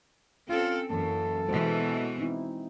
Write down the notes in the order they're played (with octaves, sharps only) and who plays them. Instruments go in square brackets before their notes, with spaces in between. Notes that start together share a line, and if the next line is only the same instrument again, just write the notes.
[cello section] C4 A4 [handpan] C#4 [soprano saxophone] F4
[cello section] F#2 [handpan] E3 A#3 [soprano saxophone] A4
[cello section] B2 E3 [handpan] G#3 F#4 C5
[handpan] C4 D#4 E4